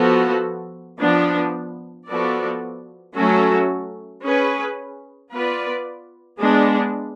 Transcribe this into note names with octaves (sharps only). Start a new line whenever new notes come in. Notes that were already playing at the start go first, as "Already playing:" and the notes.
Already playing: F3 B3 F#4 A4
F3 B3 D4
F3 B3 F#4 A4 D5
F#3 A3 C#4 F#4 A4
C#4 G#4 B4
B3 F4 B4 D5
G#3 B3 D4